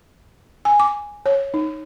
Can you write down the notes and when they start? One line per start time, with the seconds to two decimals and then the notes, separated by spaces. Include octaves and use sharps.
0.65 G#5
0.80 D6
1.26 C#5
1.54 D#4